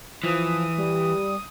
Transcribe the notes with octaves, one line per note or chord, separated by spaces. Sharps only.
E3 F3 D#6
G3